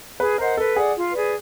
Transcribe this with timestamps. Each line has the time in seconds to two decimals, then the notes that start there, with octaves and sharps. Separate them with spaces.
0.20 G#4 B4
0.38 A#4 C5 D#5 F#5
0.57 A4 B4
0.76 G#4 D5 F#5
0.95 F4
1.14 G#4 B4 D5